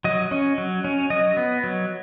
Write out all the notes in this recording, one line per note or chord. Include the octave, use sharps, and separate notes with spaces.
F#3 D#5
C#4
F#3
C#4
F#3 D#5
B3
F#3